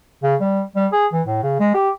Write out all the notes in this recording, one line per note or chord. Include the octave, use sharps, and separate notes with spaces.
C#3
G3
G3
G#4
E3
A2
C#3
G#3
G4